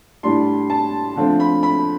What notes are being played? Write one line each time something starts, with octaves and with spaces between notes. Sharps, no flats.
A2 G3 D4 C6
A5
D3 F3 A3 C4
B5
B5